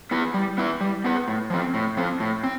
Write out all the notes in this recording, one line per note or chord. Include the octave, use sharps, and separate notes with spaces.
B3 E4 B4
G3
B3 E4 B4
G3
B3 E4 B4
A2
F3 C4
A2
F3 C4
A2
C4